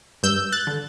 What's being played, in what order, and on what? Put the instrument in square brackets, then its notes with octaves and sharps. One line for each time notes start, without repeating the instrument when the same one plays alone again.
[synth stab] G2 E6 G6
F#6 A6
D3